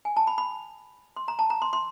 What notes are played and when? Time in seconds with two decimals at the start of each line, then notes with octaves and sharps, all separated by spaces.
0.05 G#5
0.16 A5
0.27 B5
0.38 B5
1.16 C6
1.28 A#5
1.39 A5
1.50 A#5
1.62 C6
1.73 C6